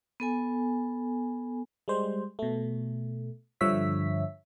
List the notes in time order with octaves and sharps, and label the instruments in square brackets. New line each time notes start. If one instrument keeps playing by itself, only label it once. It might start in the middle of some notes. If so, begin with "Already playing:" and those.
[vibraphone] B3 A4 G#5
[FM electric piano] G3 G#3 C5
B2 A3
G2 D3 F3 C#5 E5 B6